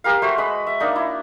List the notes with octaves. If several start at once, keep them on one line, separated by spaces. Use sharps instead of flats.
G4 A#4 F5
A3 F#4 C5
G#3 B4 B5
E5
A#3 D4 D#4
E4